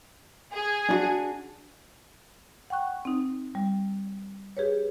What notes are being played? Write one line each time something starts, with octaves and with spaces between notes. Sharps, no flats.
G#4
D4 E4 F#4
F#5 G5 C#6 F#6
C4 D#4
G3
G4 G#4 B4 C#5